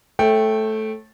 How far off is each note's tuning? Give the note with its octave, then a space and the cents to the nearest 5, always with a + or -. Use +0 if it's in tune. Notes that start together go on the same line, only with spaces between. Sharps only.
A3 -10 C#5 -35 G5 +0